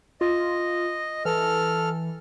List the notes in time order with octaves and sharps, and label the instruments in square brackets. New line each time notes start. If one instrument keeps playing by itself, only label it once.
[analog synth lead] F4 [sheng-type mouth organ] D#5
[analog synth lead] E3 [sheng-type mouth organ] A4 F6